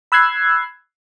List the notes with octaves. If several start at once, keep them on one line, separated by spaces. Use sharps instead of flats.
B5 E6 F#6 G#6 C7